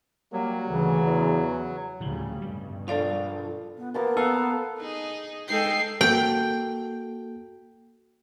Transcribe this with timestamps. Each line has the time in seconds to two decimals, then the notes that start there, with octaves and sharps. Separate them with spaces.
0.33 F#3 G3 A#3
0.68 D2 C#3 E3
1.03 E2
2.00 D2 A2 C#3 F3 G3
2.42 G2 B2 G3
2.88 F3 D4 A4 D5 F5
3.77 B3
3.94 A#3 B3 A#4 A5
4.17 B3 A4 F5
4.78 D#4 G#4
5.48 G#3 D#4 G#4 A4 G5 C7
6.01 A#3 F#4 A4 G5